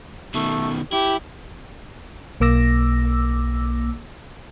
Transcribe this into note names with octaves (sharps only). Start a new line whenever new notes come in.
B2 D#3 A3
E4 G4
B1 A#3 D6 E6 A#6